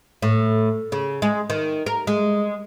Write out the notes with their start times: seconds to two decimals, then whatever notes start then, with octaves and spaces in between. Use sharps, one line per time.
0.22 A2
0.92 C#3
1.22 G#3
1.50 D#3
1.86 A#4
2.07 G#3